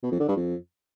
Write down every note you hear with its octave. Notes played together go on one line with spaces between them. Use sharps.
B2
F2
D3
G2
F2